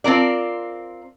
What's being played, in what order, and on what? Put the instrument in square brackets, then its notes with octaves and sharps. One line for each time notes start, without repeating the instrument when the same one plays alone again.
[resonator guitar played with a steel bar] C4 F4 A#4 D5